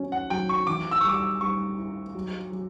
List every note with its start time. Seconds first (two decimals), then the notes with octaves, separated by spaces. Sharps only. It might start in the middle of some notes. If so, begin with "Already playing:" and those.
Already playing: F#3 C#4
0.12 F#5
0.30 F#3 G5
0.49 C#6
0.67 E3 D6
0.91 E6
1.01 C#6
1.04 G3 D6
1.16 E6
1.41 G3 C#6
1.78 E4
2.15 F#3
2.52 F#3